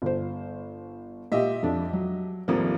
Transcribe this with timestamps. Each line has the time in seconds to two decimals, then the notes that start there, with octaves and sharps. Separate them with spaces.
0.02 G1 C5
1.32 A#2 G4 D#5 E5
1.63 F2 D4
1.93 F#3
2.48 D#1 G#1 F3 A#3 C4